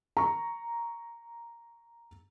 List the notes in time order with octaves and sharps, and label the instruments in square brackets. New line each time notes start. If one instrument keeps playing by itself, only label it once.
[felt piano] A#5 C#6